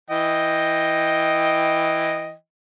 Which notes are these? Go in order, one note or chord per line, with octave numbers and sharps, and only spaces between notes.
E3 D#5 G5